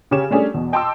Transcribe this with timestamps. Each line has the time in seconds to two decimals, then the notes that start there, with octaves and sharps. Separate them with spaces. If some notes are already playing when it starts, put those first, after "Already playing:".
0.11 C#3 G4 C#5 E7
0.31 G3 A3 C#4 D4 G#4
0.54 E2 B2
0.72 D#5 G5 A5 C6 D6 E6